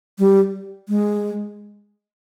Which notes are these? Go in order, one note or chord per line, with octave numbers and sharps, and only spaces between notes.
G3
G#3